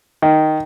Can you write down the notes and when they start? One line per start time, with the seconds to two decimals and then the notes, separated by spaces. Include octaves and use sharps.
0.22 D#3